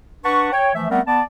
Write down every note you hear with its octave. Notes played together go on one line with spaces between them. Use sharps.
D4 B4 F#5 A5 C#6
C#5 G5
E3 F3 A3 E5
G3 A3 B3 C4 A#4 F#5
B3 D5 A5